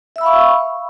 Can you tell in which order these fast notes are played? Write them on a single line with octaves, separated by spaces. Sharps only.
E5 E6 B5 F5 C#6